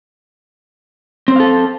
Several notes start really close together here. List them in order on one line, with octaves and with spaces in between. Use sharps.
C4 C5 F5 A4